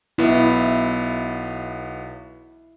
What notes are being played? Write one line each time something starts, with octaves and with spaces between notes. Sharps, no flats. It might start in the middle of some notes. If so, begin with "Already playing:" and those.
B1 B3 E4